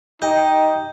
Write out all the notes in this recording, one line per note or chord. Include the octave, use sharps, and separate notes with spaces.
D#4 G4 D#5 G6